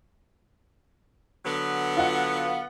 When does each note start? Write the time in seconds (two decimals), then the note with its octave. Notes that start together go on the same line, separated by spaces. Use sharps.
1.45 D3 F#3 B3
1.97 F4 F#5